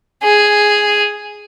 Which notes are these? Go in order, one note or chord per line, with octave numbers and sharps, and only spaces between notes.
G#4